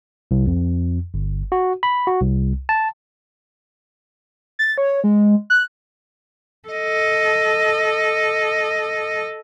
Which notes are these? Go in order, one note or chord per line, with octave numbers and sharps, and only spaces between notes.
C2
F2
G1
F#4
B5
F#4
C2
A5
A6
C#5
G#3
F#6
A4 D#5